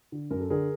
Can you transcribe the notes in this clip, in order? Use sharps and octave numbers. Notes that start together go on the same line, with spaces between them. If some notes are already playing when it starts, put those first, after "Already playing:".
D3
F#2 A#4
A4
D3 G#4 A#4